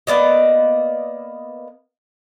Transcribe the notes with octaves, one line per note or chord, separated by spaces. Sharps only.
A#3 B3 D5 D#5